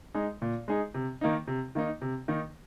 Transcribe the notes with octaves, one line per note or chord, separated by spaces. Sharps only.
G#3 D#4 G#4
A#2
G#3 D#4 G#4
C3
D#3 A#3 D#4
C3
D#3 A#3 D#4
C3
D#3 A#3 D#4